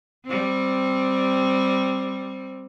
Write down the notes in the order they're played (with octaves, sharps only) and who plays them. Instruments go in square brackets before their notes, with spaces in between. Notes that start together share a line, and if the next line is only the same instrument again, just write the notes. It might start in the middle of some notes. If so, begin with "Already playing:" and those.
[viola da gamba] G3 C4